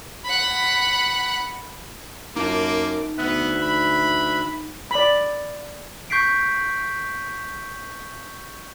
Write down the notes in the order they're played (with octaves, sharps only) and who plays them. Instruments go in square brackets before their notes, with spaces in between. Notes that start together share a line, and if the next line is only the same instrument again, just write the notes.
[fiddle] F#5 B5
[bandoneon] F#2 D6 [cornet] A#3 [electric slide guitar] D#4 F4 A5
[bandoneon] D2 E5 F#6 [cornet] B3
[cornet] B5
[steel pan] D5 B5
[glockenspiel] C#6 G6 B6 C7 D7